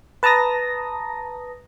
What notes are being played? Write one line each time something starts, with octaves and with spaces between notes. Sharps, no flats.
B4 A5 A#5 D#6 A#6